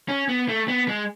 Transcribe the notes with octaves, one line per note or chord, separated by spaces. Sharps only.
C#4
B3
A3
B3
G#3